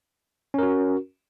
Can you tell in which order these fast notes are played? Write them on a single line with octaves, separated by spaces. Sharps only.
C#4 A#4 F#4